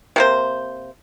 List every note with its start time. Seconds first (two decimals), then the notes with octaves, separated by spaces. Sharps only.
0.16 C3 A#3 C5